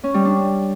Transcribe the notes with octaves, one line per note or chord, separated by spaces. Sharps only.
C#4
G3
D4